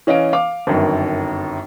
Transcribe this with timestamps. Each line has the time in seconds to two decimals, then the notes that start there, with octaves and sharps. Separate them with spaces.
0.07 E3 C#4 D#5 F5 D7
0.33 F5 D6
0.67 G1 F#2 D#3